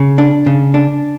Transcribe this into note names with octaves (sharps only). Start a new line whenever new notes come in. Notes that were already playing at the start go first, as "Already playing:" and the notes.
Already playing: C#3
D4
C#3
D4